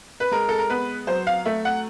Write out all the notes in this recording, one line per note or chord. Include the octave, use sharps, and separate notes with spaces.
B4
G#3 A#4
A4
A#4
B3 B4
F#3 C5
F5
A3 E5
F#5